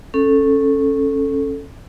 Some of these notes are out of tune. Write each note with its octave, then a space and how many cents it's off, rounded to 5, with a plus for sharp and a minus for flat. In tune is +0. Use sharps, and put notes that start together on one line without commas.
C#4 -15 A4 +0